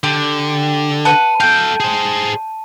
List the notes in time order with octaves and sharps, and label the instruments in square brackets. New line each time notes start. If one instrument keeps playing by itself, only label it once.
[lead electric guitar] D3 [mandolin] G4
[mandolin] B4 F#5 [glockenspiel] A5 D#7
[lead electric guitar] A4 F5 [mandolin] G5
[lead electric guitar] G#4 C5